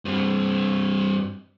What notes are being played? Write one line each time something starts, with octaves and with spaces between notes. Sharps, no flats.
G2 C4